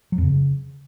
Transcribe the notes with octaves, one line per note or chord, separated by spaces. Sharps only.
F#3
F2
C#3